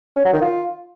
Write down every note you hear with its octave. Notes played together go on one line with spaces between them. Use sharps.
C#4
F#3
D#3
F4